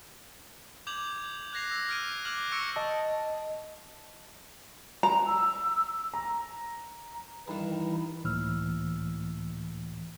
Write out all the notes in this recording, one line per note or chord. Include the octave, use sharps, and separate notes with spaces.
D6 G6 G#6 F7 F#7
F#6 G#6 A#6 C7 F7
E6 A#6
F6 G#6 D7 D#7
D6 F6 G6 G#6 F#7
C#6 E6 A#6 C#7 D7
D#5 A5
A#5
E6
A#5
G2 D#3 E3 D#4 E4
C#2 A2 E3 A#3 E6 F6